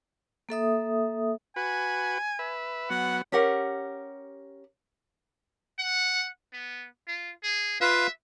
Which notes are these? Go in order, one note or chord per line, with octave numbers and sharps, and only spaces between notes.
A#3 A4 E5 D#6
F#4 B4 G#5
B4 E5
F#3 B3 F#5
C#4 G4 A#4 F#5
F#5
B3
F4
G#4
F4 B4 E5 F5